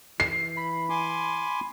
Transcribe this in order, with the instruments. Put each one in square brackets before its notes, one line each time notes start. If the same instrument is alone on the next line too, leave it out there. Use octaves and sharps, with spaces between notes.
[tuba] E3 [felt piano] C7
[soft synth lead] B5
[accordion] G#5 C6 D6